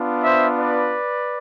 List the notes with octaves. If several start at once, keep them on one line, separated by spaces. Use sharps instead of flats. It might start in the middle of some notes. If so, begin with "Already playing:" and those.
Already playing: B3 D4 F4
C5 E5
B4 D5